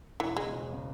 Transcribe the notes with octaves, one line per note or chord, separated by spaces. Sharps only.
E1 E3
E2 C#3 G#3
E1
C#3